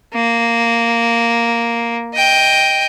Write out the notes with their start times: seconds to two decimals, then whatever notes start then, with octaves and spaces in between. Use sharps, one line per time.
0.14 A#3
2.14 D#5 G5